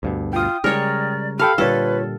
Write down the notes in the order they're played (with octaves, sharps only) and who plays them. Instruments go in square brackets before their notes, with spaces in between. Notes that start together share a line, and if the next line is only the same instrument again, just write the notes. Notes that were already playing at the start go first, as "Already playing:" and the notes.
[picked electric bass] D2 G2 B2
[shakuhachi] F4 [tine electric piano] G5 D#6
[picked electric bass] C#3 G3 G#3 [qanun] A#4 C#5 [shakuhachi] D5
[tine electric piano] G4 A4 G5 [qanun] F5 [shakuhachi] B5
[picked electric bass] A#2 D3 G3 [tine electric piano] F4 C#5 [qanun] A4 [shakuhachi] B4